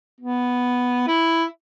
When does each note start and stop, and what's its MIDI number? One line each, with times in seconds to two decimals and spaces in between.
0.21 1.04 59
1.08 1.44 64